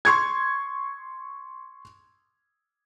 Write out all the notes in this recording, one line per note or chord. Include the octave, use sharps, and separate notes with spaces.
C6 C#6 G#6